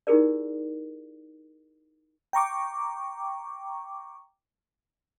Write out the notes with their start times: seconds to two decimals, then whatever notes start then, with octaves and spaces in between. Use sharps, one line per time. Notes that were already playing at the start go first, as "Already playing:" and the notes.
0.07 D#4 E4 G4 G#4 A#4 D5
2.33 G5 A#5 C#6 D6